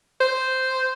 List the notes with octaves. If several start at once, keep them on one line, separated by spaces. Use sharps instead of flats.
C5